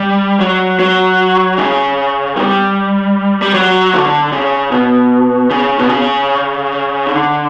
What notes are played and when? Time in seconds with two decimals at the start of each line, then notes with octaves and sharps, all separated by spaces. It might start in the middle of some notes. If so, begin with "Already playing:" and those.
Already playing: G3
0.40 F#3
0.79 F#3
1.58 C#3
2.36 G3
3.42 G3
3.54 F#3
3.94 D3
4.32 C#3
4.72 B2
5.50 C#3
5.79 B2
5.89 C#3
7.06 D3